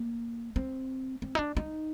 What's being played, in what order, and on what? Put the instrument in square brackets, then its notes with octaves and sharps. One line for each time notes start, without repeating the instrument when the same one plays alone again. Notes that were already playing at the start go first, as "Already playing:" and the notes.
Already playing: [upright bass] A#3
C4
C4
D#4
D4
D#4